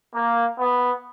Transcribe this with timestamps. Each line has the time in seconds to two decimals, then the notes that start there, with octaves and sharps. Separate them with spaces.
0.15 A#3
0.60 B3